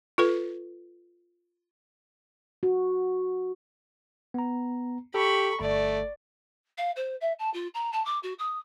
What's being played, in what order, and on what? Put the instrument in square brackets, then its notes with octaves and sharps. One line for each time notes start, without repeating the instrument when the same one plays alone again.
[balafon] F4 A4 B4
[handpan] F#4
[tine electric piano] B3 A#5
[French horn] G4 [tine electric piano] A4 [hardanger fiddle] B5 C#6
[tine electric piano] G1 [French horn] A3 [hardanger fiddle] D5
[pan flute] F5
C5
E5
A5
F4
A#5
A5
D6
F#4
D#6